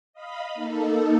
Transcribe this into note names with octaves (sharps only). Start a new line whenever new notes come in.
D#5 F5 B5
A#3 D#4 A4